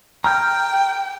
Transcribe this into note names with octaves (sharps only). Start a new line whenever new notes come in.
G5 A#5 F6 G6